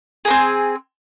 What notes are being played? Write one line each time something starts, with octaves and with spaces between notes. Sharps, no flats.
A#3 C4 G#4